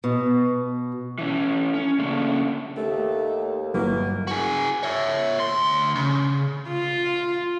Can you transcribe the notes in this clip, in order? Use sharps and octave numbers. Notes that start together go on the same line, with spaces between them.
B2
E3 C#4
C#4
C#3 A3 A#3 C#4 D4
D#2 A3
G1 F#3 A#3 E4 F#4 B4
F#4 G#4
C#5 E5
D2 C6
C#3
F4